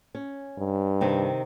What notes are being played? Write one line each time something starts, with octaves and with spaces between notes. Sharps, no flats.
C#4
G2
C3 D#3 C4